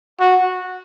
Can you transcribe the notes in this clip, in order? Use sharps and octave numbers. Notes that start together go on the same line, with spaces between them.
F#4